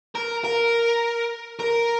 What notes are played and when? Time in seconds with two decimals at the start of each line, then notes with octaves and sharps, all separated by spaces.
0.15 A#4
0.44 A#4
1.59 A#4